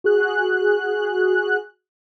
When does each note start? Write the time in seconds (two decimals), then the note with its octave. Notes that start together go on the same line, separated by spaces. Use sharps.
0.04 F#4 G#4 F#6